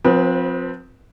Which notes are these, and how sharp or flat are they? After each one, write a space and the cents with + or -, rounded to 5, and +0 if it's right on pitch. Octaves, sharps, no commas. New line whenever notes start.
F3 +30 C4 +0 B4 -30